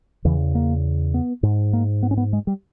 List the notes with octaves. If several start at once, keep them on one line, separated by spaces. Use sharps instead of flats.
E2 C#3 E3
A#3
B3
G#2
A#3
B3
C#4
B3
G#3
G3